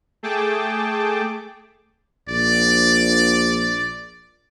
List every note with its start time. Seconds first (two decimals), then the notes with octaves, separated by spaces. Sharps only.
0.23 A3 G#4 G5 A5 D6
2.29 A#1 D5